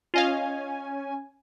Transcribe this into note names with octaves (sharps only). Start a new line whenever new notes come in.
C#4 F4 D#5 F5 G#5